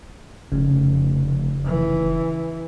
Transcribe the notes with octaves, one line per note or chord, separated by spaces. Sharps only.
F1 C#3
E3